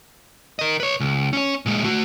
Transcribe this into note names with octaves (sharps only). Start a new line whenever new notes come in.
A#4 D#5
B4 C#5
C#2
C#4 C#5
A#2 G#3
A3 F#4